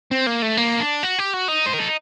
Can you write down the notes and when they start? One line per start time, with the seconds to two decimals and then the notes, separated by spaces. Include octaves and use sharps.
0.11 C4
0.27 A#3
0.42 A3
0.57 A#3
0.80 D4
1.03 F#4
1.19 G4
1.34 F#4
1.48 D#4
1.66 C5
1.74 A#4
1.80 A4